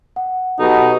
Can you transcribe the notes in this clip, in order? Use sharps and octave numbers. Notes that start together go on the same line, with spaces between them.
F#5
B2 F#3 D#4 F#4 G4 A4 F#5